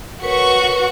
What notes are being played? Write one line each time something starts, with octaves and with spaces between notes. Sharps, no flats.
F#4 A#4 B4 C#5 C#6